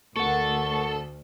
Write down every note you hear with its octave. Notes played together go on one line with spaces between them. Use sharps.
D2 A3 A4 A#4 F#5 C#6